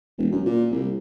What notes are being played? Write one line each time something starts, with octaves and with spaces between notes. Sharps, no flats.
E1
F#2
A#2
C2